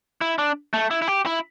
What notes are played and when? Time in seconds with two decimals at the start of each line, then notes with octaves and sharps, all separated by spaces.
0.21 E4
0.38 D4
0.74 A3
0.91 E4
1.02 E4
1.08 G4
1.26 E4